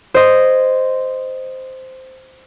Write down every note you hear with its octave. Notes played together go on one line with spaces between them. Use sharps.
C5 D#5